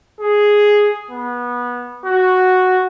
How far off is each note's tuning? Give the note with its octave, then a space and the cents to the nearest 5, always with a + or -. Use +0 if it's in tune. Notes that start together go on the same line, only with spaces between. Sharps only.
G#4 +0
B3 -20
F#4 +0